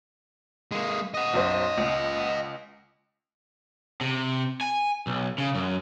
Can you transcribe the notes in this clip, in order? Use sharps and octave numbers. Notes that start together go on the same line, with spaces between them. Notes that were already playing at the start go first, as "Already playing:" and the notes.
G#3 A#3
D#5 F#5
B1 F#2 C5
C#2
C3
G#5
B1
C#3
F#2